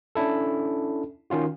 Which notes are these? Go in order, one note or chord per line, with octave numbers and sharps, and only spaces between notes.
C#4 D4 E4 A4
D#3 C#4 F4 F#4